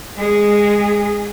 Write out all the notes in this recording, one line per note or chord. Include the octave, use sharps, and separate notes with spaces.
G#3 G#4